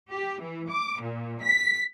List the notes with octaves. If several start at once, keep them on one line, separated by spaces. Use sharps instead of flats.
G4
E3
D6
A#2
B6